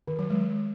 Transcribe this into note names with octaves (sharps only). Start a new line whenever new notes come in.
D#3
F#3
G#3